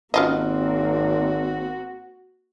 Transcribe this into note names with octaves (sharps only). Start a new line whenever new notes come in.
G#1 A#3 C4 C#4 F4 F#4 D#5